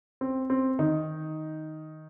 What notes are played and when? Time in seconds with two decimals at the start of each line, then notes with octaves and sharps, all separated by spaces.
0.21 C4
0.50 C4
0.79 D#3 D#4